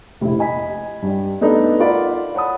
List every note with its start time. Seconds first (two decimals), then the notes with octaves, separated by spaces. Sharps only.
0.21 F1 A#1 E4
0.39 D#5 G#5 B5 B6
1.02 G2 D4
1.41 A3 B3 D4 D#4 A4
1.80 F4 A#4 D5 F5 F#5 B5
2.35 C#5 F#5 A5 B5 D#6